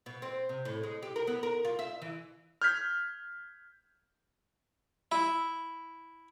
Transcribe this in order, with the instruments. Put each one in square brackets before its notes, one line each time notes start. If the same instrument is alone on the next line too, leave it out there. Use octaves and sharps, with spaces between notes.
[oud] B2
C4
C3
A2
G#3
G4
A#4
B3
A#4
F4
E5
E3
[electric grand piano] F6 G6 G#6 B6
[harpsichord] E4